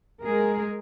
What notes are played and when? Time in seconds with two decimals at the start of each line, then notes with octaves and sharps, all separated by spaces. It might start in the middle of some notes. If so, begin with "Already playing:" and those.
0.22 G#3 G#4 A#4